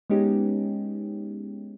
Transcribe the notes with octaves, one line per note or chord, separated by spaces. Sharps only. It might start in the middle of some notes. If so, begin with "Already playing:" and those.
G#3 B3 C#4 D#4 G4